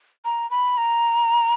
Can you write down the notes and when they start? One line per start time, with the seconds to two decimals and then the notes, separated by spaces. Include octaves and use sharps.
0.25 A#5
0.51 B5
0.78 A#5